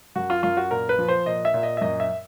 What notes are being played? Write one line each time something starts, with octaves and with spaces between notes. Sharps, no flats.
F#2 F#4
F4
F#2 F4
F#4
A#2 A#4
B4
F3
C5
A#2 D#5
E5
A#2
D#5
E5
F#2 D#5
E5